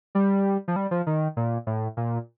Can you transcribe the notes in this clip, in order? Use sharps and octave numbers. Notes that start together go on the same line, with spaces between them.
G3
F3
G3
F3
D#3
A#2
A2
A#2